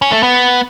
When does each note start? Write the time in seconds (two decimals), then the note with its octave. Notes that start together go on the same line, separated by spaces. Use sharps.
0.02 C#4
0.12 A3
0.23 B3